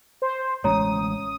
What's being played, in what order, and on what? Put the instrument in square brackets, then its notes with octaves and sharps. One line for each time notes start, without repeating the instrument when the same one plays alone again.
[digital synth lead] C5
[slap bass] A1 G#3 C#4 [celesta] C#5 A#5 [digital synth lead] D#6